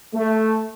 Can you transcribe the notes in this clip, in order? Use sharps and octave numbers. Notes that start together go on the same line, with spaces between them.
A3